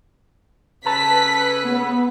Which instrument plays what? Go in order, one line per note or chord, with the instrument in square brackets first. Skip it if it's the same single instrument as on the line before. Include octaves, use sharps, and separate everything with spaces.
[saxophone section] C#3 A4 B4 [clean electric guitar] A5 [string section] B6
[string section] B3